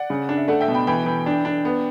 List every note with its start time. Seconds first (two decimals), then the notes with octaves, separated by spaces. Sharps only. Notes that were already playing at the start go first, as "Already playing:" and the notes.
Already playing: D5 F#5
0.10 C#3
0.29 D4
0.37 E5
0.48 A3 D5 F#5
0.61 E5 G5
0.68 B2
0.74 G5 B5
0.87 E3 G5 B5
1.06 E3
1.26 D4
1.45 D4
1.65 B3